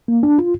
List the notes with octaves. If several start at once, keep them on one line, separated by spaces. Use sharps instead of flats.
A#3
D4
F4